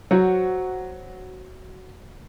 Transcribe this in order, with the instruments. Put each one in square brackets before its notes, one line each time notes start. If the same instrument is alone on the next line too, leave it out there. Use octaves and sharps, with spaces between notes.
[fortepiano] F#3 [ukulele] F#4 C5 F#5